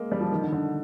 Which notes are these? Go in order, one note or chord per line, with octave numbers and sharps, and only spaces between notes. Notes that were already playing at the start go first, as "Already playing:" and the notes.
Already playing: G#3 A#3
G3
F3
D#3
D3
D3